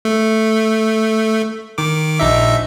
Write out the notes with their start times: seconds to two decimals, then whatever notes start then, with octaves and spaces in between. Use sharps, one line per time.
0.05 A3
1.78 D#3 D6
2.19 A#1 D#4 E5